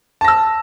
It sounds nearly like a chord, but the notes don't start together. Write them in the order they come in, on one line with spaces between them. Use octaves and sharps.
A5 A#6 E6